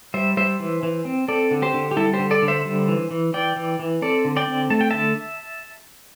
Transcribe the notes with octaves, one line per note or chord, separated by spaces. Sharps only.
G3 C5 E5
G3 C5 E5
E3
E3
C4
C4 A4 D5
D3
G4 C5
D3
G4
G3 E4 A4
G4 C5
D3
A4 D5
D3
C5 E5
G3
E3
E3
E3 D5 G5
E3
E3
C4 A4 D5
D3
D5 G5
C4
A3 A5
G5
D3 E5 A5